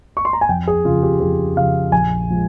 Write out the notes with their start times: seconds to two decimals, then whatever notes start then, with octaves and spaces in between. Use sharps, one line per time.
0.17 C#6
0.25 C6
0.33 A#5
0.41 G#5
0.49 F2 G5
0.67 G#4
0.85 C#3 F4
0.89 F3
1.03 G4
1.20 F2 G#4
1.57 C#3 F3 F5
1.92 A#1 G#5
2.30 F3 G#3